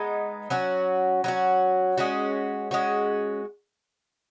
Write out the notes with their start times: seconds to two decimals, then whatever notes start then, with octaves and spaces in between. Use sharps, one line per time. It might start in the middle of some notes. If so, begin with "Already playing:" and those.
Already playing: G#3 B3 D#4
0.50 F#3 C#4 F#4
1.24 F#3 C#4 F#4
1.98 G#3 C#4 F#4
2.71 G#3 C#4 F#4